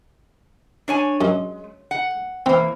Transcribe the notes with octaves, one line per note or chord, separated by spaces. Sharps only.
D4 C#5 G#5
F#2 G#3
F#5
E3 A#3 C4